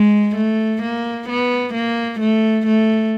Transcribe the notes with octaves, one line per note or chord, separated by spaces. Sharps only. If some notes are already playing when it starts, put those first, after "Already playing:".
Already playing: G#3
A3
A#3
B3
A#3
A3
A3